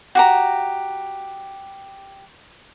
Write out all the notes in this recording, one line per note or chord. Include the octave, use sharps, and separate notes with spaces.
F#4 G4 A#5